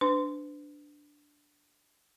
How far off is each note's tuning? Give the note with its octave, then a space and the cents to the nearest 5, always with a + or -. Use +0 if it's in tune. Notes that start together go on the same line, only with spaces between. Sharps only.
D4 +0 B4 +40